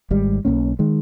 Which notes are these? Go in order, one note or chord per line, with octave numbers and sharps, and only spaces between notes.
G#1 G#2 G3
B1 A#2 A#3 C#4
D#3 G#3